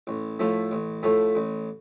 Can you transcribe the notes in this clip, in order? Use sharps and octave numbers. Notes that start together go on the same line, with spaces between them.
A1
A2 F3 A3
A1
A2 F3 A3
A1